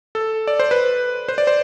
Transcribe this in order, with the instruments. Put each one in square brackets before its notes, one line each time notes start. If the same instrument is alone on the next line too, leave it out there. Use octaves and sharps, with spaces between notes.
[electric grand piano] A4
D5
C5
B4
C5
D5
C5